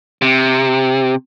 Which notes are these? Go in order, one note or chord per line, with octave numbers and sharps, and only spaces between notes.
C3